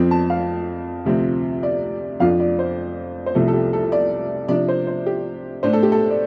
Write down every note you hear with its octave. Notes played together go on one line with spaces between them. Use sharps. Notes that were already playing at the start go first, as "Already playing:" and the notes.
Already playing: F2 F3 C4
A5
F5
D2 C3 F3 C4
D5
F2 F3 D4 F4 F5
D5
C5
C5
C2 C3 F3 A3 A4
A4
G4
A4
D5
C3 F3 D4 D5
C5
C5
G4
A2 A3 D4 C5
A4
G4
A4
D5